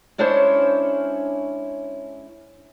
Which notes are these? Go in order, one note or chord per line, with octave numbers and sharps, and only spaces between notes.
G#3 C#4 D4 E4 C5 C#5